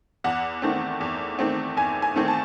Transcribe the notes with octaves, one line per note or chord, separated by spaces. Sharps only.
E2 F#5
D#3 A3 C4
E2
D#3 A3 C4
E2 G#5
G#5
D#3 A3 C4
A5